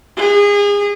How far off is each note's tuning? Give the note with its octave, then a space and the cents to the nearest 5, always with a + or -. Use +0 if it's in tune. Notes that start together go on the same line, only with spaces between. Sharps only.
G#4 -30